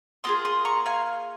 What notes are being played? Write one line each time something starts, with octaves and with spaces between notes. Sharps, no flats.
A#3 F4 G#4 C6 D#6
C6 D#6
A#5 C#6
F5 G#5